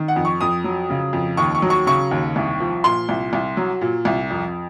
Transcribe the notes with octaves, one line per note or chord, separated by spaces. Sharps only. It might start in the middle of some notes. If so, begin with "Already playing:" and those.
Already playing: D#3
F#5
F2
C#6
F2 D#6
F#3
C#3
F2
D#2 C#6
C#6
F#3
C#6
C#3 C#6
D#2
C2
F3
A#2 C6
C2
C2
F#3
A#2
C2
F2